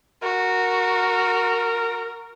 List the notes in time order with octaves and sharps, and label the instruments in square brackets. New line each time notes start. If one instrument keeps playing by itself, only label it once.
[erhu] F#4 [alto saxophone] A#4